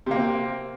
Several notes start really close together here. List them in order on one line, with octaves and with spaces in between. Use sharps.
C3 A#3 C4